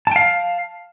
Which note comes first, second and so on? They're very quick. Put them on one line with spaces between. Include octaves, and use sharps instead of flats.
A5 G5 F5